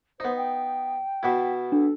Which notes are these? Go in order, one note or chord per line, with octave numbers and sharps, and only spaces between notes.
B3 D#4 C5
G5
B2 B3 E4
D4 A4